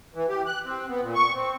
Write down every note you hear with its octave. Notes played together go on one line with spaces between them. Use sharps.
E3
G4
F#6
C4
B3
A#2
C#6
C4